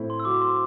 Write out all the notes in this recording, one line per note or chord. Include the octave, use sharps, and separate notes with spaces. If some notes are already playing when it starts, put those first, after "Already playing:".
Already playing: A2 C4 E4
C6
E6
F#3 D6
C6